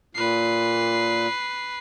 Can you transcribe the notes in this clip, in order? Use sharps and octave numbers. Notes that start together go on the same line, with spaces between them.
A#2 B4 C7